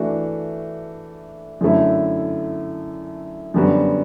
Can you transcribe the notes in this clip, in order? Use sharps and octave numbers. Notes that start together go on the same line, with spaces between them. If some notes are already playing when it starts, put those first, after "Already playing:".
Already playing: E3 A3 D4 F#4
F#2 D3 A3 E4
F#2 D3 G3 B3 F#4